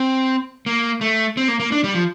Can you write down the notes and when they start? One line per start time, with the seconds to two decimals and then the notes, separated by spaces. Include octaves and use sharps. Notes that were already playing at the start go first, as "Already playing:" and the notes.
Already playing: C4
0.66 A#3
1.01 A3
1.37 C4
1.48 A#3
1.60 A#3
1.72 D4
1.84 G3
1.94 F3